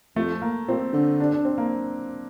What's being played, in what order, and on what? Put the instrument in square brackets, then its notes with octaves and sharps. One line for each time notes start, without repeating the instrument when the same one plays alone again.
[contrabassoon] F2 [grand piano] A3
[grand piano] A#3
[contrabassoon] A#2 [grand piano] C4
[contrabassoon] D3
[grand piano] D4
D4
C4
A#3